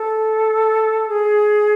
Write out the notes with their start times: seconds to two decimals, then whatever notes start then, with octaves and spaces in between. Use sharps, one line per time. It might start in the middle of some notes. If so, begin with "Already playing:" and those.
Already playing: A4
1.09 G#4